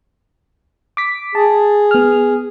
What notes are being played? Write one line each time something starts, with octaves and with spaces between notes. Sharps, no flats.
D6 B6
G#4 A5
B3 F6